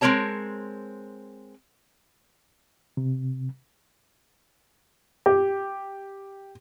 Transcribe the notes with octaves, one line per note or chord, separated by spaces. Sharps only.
G#3 C4 D4 A#4 C#5 A5
C3
G4